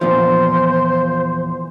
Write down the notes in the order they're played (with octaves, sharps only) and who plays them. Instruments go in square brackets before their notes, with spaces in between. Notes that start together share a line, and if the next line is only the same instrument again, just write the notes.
[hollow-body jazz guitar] E2 A#2 F3 [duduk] C5